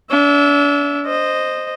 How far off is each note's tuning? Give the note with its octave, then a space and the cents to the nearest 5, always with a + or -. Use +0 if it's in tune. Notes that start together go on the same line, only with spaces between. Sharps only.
D4 -40 E5 +0
C5 +0 D#5 -10